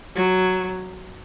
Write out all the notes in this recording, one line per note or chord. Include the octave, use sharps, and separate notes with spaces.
F#3